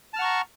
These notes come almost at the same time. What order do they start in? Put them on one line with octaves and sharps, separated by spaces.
A5 F6 F#5 C#6 A#5